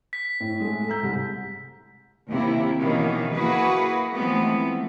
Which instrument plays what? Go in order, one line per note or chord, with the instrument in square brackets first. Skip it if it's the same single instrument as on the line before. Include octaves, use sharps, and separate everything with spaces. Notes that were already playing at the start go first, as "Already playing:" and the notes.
[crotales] B6
[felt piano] A2
G#3 A3
A#5 E6 G6
C2 G#3
[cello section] D#2 C3 A#3 E4
B2 D#3 E3 A#3 C#4
A#3 E4 F#4 G#4 B4
E3 F3 G#3 A3 B3 C4